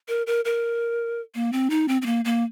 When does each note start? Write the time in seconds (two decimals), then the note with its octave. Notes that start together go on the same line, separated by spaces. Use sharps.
0.08 A#4
0.27 A#4
0.45 A#4
1.35 A#3
1.52 C4
1.70 D#4
1.88 C4
2.02 C4
2.06 A#3
2.25 A#3